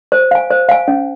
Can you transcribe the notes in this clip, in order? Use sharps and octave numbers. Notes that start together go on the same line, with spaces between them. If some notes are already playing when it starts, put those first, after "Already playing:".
C5
F5 G#5
C5
F5 G#5
C#4